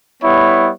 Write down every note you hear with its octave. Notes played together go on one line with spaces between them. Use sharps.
G3 B3 E4 C#5